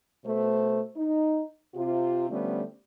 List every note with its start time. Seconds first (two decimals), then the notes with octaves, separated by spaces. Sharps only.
0.25 B2 A3 C5
0.96 D#4
1.74 C3 F4
2.29 D3 F3 G3 A3 B3 C#4